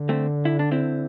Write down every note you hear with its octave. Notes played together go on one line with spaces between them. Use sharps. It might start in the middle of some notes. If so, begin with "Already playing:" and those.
Already playing: D3
A3 C4
E4
D4
C4 E4